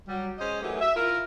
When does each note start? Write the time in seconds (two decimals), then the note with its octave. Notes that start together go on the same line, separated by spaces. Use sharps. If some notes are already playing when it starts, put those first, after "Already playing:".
0.07 F#3 G3
0.38 G#3 C#4 C5 D#5
0.61 D#3 E3 F#3 A3 G4 G#4
0.81 E5
0.95 E4 F4 A#4